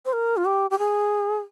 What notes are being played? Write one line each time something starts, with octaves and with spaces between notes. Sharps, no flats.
C5
A#4
F4
G4
G4
G#4